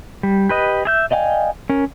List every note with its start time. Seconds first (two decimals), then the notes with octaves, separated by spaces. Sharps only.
0.23 G3
0.49 G4 B4 D#5
0.85 G#4 E5 G6
1.11 D5 D#5 F5 G5 G#5
1.70 C#4 A#4